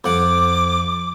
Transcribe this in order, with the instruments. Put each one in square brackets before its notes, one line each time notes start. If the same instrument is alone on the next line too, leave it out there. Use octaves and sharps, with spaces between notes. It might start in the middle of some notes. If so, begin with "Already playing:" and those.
[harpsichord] F2 F#5 [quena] D6